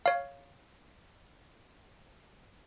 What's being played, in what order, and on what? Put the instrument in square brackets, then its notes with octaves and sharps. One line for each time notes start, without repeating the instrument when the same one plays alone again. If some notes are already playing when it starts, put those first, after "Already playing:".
[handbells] C#5 F5